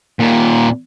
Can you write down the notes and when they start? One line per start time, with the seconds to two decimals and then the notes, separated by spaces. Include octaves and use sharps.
0.20 D#2 A#2